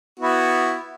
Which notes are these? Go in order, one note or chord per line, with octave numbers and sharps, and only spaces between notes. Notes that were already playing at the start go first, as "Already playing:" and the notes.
B3 E4 F#4